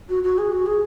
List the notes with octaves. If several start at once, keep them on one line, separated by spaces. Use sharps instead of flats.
F#4
F#4
G#4
F#4
G#4